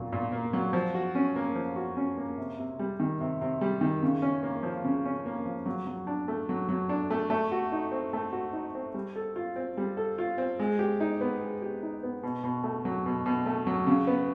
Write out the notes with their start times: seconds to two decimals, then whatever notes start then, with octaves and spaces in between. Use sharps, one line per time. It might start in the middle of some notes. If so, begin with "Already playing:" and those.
Already playing: A#2 F#3 A#3
0.13 A#2
0.32 A#3
0.53 F#3
0.73 F3
0.95 F#4
1.15 C#4
1.36 A#3
1.55 F3
1.76 F#4
1.97 C#4
2.17 A#3
2.38 C3
2.58 C3
2.79 G3
3.00 D#3
3.21 C3
3.41 C3
3.61 G3
3.81 D#3
4.03 C#3
4.22 C#4
4.43 A#3
4.63 F3
4.84 C#3
5.05 C#4
5.26 A#3
5.46 F3
5.66 F#3
5.87 F#3
6.07 D4
6.28 A3
6.49 F#3
6.69 F#3
6.89 D4
7.10 A3
7.30 A3
7.52 F#4
7.72 D#4
7.92 C4
8.13 A3
8.33 F#4
8.53 D#4
8.75 C4
8.94 G3
9.16 A4
9.36 F4
9.56 C4
9.77 G3
9.97 A4
10.18 F4
10.38 C4
10.60 G#3
10.79 G4
11.00 D#4
11.21 B3
11.41 G#3
11.62 G4
11.83 D#4
12.03 B3
12.23 B2
12.44 B2
12.64 A3
12.85 F#3
13.06 B2
13.26 B2
13.46 A3
13.67 F#3
13.87 C#3
14.07 B3